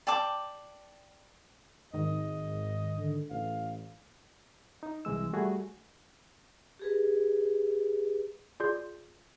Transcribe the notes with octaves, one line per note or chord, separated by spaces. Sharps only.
D5 G5 A5 D6
G#1 G#2 D#3 D#5
D3
A1 F5
D#4
C2 E3 G#3 E6
G3 A3 F#4 G#4
G4 G#4 B4
F4 G#4 D5 C6 G6